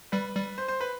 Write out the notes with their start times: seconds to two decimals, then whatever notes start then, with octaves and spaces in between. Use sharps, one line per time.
0.12 G3 B4
0.35 G3
0.58 C5
0.68 C5
0.81 B4